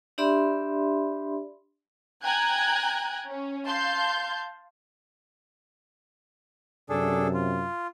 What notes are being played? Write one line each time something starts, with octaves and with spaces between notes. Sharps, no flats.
D4 G4 D5 E5 B5 C6
G5 G#5 A#5 F#6 G#6
C#4
F5 A5 C6 G6
F#2 C3 D4 G#4 A4
F4